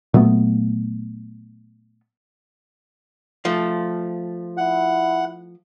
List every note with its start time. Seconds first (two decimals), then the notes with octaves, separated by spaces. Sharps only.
0.14 A#2 F#3 A3 B3
3.45 F3 A3
4.57 E4 F#5